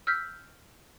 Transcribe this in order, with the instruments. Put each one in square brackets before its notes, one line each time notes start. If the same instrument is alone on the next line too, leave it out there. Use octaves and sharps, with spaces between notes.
[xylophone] E6 F6 G6 B6